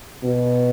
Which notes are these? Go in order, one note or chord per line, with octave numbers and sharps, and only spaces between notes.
B2